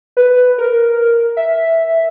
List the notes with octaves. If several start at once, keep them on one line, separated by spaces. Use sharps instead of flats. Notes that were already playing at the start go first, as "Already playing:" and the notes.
B4
A#4
E5